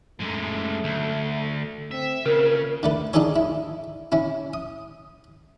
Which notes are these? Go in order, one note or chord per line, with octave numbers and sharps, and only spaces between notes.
F#2 G#3 A3
D2
C4 E5
A#2 C#3 A#4
D3 A3 B4
D4 D#4 F4 G#4 A4 C#5
E4
C#4 E4
D#6